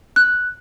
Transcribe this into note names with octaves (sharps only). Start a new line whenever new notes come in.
F#6